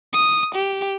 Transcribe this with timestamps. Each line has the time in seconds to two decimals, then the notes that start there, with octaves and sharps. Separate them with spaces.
0.13 D#6
0.55 G4